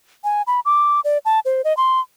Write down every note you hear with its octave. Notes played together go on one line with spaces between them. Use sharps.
G#5
B5
D6
D5
A5
C5
D#5
C6